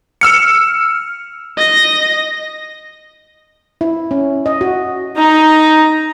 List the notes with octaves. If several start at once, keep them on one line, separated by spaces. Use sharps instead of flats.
E6 F6 C#7
D#5 A#6
E4
C#4
D#5
F#4
D#4 A#5